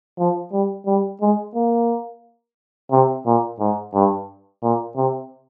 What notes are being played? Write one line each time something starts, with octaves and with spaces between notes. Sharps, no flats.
F3
G3
G3
G#3
A#3
C3
A#2
G#2
G2
A#2
C3